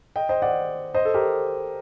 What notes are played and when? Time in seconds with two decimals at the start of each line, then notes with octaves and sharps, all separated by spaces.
0.16 D#5 G5
0.29 C5 D#5
0.42 D5 F#5
0.94 C5 D#5
1.05 A4
1.14 G4 A#4